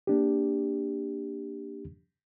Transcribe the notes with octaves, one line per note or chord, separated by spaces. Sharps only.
A#3 D4 G4